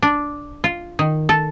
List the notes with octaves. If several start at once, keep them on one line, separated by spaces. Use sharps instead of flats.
D4
F4
D#3
A4